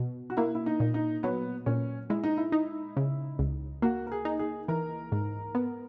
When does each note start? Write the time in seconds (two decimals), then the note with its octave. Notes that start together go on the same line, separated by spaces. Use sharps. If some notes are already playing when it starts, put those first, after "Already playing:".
Already playing: B2
0.30 F#4
0.37 A#3 E4
0.55 E4
0.66 D#4
0.80 A#2
0.94 D#4
1.23 F#3 B3
1.66 A#2 C#4
2.10 G#3 E4
2.24 D#4
2.37 E4
2.52 D#4
2.97 C#3
3.39 C#2
3.82 A#3 F#4
4.07 A#4
4.12 G#4
4.25 D#4
4.39 G#4
4.68 E3 A#4
5.12 G#2
5.55 B3